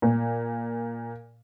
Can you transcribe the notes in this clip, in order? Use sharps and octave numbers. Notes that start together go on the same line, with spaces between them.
A#2